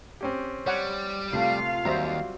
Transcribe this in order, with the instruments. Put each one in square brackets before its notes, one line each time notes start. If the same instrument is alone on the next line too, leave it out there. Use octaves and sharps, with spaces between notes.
[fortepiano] C4 C#4 G4
[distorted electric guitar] G3 [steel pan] C#5 F#5
[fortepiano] C3 A3 [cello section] F4 F5
[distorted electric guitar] D#2 [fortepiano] F#3 G3 C4 [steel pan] C5 E5 A#5